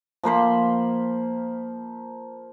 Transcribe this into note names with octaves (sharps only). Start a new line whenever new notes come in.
F3 A#3 C5 B5